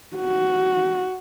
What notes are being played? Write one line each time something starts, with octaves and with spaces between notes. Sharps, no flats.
F#4